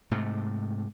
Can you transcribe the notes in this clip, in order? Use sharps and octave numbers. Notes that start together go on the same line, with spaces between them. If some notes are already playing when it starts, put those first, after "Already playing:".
G#2 C3 A3